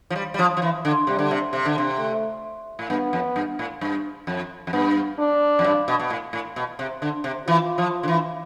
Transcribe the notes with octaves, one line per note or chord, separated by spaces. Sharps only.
F3
G3
G3
F3
F3
E3
D3
C3 G3
D3
C3
C3
D3
C3
A3
A2
G2 B3
F2
G2
A2
G2
F2
F2
G2 B3
D4
F2
G2
B2
B2
A2
A2
B2
C3
D3
C3
E3 F4
F3
D3
E3